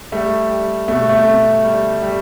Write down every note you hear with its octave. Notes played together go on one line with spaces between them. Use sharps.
G3 A3
G3
B2 A3
A3
B2
G3
G3